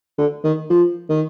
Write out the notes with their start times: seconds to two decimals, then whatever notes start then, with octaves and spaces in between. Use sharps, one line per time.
0.18 D3
0.44 D#3
0.70 F3
1.09 D#3